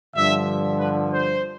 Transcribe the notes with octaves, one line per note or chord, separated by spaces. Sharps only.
G2 D3 F3 E5
B4
C5